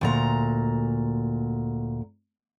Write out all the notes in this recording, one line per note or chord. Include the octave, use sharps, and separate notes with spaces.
D2 A#2 A#5